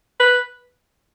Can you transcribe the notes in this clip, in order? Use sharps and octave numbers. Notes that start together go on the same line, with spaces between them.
B4